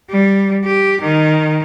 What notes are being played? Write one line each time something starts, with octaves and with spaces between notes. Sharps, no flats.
G3
G4
D#3